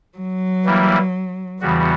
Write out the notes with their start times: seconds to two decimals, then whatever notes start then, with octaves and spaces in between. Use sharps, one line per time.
0.17 F#3
0.65 E3 G3 A#3 E4
1.61 E2 C#3 E3 G3 B3 F#4